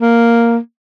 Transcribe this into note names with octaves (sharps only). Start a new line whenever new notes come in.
A#3